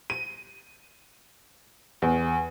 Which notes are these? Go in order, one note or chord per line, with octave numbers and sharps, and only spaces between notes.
D#7
E2